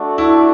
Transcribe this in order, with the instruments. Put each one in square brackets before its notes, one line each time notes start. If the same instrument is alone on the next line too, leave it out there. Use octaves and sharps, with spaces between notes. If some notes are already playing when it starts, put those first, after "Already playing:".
Already playing: [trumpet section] A3 D4 F#4 A4
[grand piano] E4